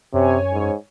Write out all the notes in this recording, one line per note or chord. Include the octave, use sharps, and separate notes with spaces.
F#2 C3 C#5 G#5
G#2